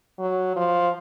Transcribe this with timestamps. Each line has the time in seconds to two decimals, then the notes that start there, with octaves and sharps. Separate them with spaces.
0.19 F#3
0.56 F3